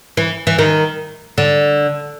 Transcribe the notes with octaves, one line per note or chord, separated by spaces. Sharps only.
E3
E3
D#3
D3